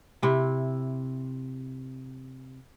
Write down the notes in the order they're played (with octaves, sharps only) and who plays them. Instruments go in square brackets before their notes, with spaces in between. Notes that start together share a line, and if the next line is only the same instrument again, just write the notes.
[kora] C3 E4